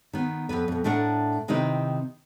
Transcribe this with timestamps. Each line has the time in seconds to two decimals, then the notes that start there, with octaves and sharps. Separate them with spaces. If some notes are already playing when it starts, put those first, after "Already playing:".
0.13 D#3 B3
0.49 F2 A#2 B3 B4
0.68 F2 B2
0.84 A2 A3 D4 A#4 F#5
1.48 C3 D#3 C4 D#4 E4 B4